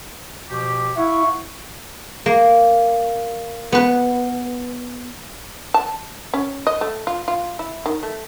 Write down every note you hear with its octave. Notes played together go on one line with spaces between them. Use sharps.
B2 F3 G4
E4 F5 F#5 C#6
A#3
B3 B4
A5
C#4
D#5
A3
F4
F4
E4
D#3
A3